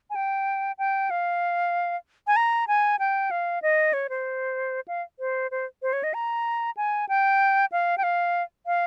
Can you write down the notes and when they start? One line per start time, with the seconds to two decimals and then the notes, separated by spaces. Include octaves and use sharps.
0.10 G#5
0.15 G5
0.78 G5
1.10 F5
2.27 G#5
2.36 A#5
2.68 G#5
2.99 G5
3.31 F5
3.62 D#5
3.93 C#5
4.10 C5
4.88 F5
5.20 C5
5.51 C5
5.82 C5
5.93 C#5
6.04 D#5
6.14 A#5
6.77 G#5
7.09 G5
7.72 F5
7.98 G5
8.03 F5
8.66 F5